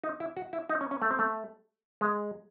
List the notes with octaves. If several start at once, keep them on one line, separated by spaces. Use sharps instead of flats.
D#4
E4
F#4
E4
D#4
C#4
C#4
A3
C4
A3
G#3